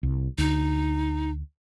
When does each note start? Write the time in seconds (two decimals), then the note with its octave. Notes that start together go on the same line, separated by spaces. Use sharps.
0.03 C2
0.38 D2 D#4